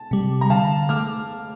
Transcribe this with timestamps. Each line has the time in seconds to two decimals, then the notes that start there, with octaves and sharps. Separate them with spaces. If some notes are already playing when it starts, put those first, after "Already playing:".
Already playing: A5
0.11 C3 G3
0.41 A#5
0.50 D3 F5 A5
0.89 A3 D6 F6